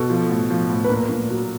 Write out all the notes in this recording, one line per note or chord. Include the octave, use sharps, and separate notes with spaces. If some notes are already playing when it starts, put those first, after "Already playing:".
Already playing: B2 A4
F3
A2
F3
A2
B4
A#2 A#4
A#2
F#3